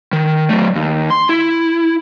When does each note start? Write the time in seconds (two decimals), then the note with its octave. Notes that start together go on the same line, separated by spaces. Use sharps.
0.13 D#3
0.49 F#3 A3
0.75 D#2
1.10 C6
1.29 E4